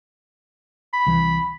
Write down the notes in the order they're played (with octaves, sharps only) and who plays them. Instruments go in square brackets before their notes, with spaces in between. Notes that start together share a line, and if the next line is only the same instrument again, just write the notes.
[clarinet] B5
[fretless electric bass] C2 E3